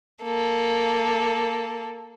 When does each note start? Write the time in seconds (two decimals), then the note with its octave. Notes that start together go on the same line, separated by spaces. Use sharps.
0.23 A#3 A4